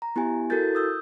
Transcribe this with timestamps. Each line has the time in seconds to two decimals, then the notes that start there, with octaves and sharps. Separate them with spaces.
0.02 A#5
0.16 B3 E4 G4 G#5
0.50 E4 F#4 A4 A#4 G6 A6
0.75 D#6 E6 G6